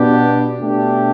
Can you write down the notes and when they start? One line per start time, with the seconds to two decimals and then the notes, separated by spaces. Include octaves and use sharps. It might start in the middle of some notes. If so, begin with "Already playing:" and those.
Already playing: B2 B3 D4 G4
0.61 B2 A3 D4 G4